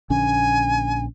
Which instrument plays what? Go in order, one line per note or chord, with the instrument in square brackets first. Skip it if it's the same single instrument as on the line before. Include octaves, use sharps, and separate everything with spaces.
[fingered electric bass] A#1 D3 C#4 [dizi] G#5